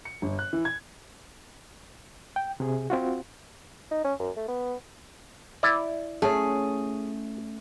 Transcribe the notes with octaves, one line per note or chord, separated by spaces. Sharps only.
C#7
G1
F#6
E3
G#6
G5
C3 G#4
C4 F4 F#4
D#4
C#4
F#2
A3
B3
E4 D5
A3 C#4 G#4